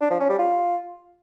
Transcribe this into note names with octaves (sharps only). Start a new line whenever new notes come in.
D4
F3
C#4
G3
F4